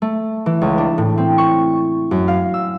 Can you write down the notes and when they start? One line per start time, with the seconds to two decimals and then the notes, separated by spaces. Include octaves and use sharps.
0.02 A3
0.46 E3
0.61 C#2
0.78 D4
0.98 A2
1.18 C4
1.38 C#6
2.11 F#2
2.28 F5
2.54 E6